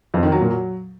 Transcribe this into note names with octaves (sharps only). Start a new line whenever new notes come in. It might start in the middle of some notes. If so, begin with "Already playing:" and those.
F2
D#3
F#3
A#2
F#3